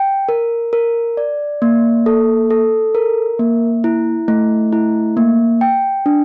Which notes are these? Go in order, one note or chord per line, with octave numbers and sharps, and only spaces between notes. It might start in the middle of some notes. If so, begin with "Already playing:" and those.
Already playing: G5
A#4
A#4
D5
A#3
A4
A4
A#4
A#3
E4
A3
E4
A#3
G5
D4